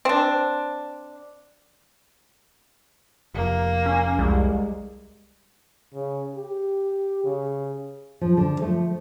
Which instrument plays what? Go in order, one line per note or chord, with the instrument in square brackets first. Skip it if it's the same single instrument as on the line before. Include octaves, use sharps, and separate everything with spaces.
[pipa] C4 D4
[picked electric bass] F1 [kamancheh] A#3
[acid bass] C#4
[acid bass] C2 [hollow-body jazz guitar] G3 G#3
[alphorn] C#3
G4
C#3
[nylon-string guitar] F3
D3
F3 A3